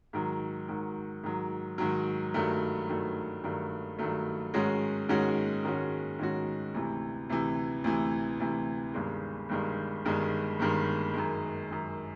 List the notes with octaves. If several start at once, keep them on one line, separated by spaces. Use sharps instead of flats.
G#2 D#3 F#3
G#2 D#3 F#3
G#2 D#3 F#3
G#2 D#3 F#3
G2 D#3 F#3 A3
G2 D#3 F#3 A3
G2 D#3 F#3 A3
G2 D#3 F#3 A3
G#2 D#3 G#3 C#4 F#4
G#2 D#3 G#3 C#4 F#4
G#2 D#3 G#3 C#4 F#4
G#2 D#3 G#3 C#4 F#4
D2 C3 E3
D2 C3 E3
D2 C3 E3
D2 C3 E3
G1 G2 D#3 G#3
G1 G2 D#3 G#3
G1 G2 D#3 G#3
G1 G2 D#3 G#3
F#2 D#3 G#3
F#2 D#3 G#3